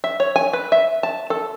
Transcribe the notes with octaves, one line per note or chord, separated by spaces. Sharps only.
E5
C#5
G#5
B4
E5
A5
A4